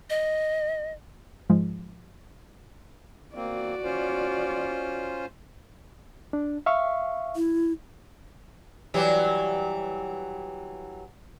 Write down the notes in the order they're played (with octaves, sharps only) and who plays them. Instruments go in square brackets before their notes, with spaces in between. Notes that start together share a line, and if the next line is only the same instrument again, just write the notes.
[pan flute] D#5
[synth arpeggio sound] G#2 F3 G#3
[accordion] A#3 C4 [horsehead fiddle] F#4 D5
[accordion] C#4 F4 C5
[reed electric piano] D4
E5 F5 C#6
[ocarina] E4
[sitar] E3 F#3 G4 [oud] G3